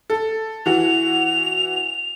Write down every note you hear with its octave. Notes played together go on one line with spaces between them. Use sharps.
A4
E3 F#4 F7